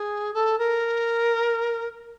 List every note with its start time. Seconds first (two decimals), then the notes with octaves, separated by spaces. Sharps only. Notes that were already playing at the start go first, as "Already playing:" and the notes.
Already playing: G#4
0.34 A4
0.58 A#4